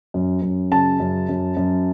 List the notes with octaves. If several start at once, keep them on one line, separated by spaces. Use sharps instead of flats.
F#2
F#2
C#3 A5
F#2
F#2
F#2